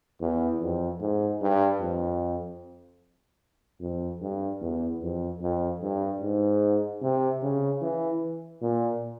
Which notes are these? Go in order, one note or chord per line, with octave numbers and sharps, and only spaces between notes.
E2
F2
G#2
G2
F2
F2
G2
E2
F2
F2
G2
G#2
C3
C#3
E3
A#2